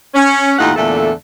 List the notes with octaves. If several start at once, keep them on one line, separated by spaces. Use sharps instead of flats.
C#4
D#2 A2 D#4 F4 F#5
E2 A#2 D3 A3 A4